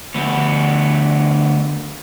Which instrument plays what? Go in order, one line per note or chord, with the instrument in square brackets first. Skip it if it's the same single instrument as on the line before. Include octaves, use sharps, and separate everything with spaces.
[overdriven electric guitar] D2 B3